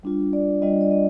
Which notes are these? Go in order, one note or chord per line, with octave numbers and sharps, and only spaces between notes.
G3 D4 F4
D5
G3 D4 F4 D#5
D5
D#5